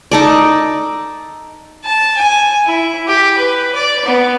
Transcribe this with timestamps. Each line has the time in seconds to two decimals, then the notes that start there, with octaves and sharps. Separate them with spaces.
0.11 D#4 A4 D5
1.85 A5
2.16 G#5
2.66 E4
3.07 G4
3.37 B4
3.75 D5
4.05 B3